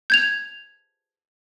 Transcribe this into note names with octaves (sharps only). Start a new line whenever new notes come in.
G6 G#6 F7